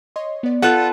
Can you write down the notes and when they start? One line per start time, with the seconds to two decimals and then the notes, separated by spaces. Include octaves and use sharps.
0.16 C#5 D#5 C6
0.43 B3 D5
0.62 F4 A4 B4 F#5 F#6